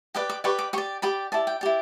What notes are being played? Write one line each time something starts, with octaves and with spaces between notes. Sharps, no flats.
G4 B4 D5 D6
D6
G4 B4 D5 C#6
D6
G4 D5 C#6
G4 D5 B5
E4 G4 D5 A5
G5
E4 G4 D5